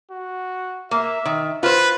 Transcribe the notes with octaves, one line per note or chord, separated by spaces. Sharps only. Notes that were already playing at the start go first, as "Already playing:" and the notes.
F#4
A#3 E5
D#3
F4 B4 C5